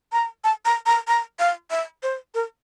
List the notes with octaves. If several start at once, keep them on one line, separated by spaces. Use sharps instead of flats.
A#5
A5
A#5
A#5
A#5
F5
E5
C5
A#4